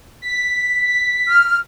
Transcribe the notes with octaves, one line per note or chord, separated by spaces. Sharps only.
B6
F6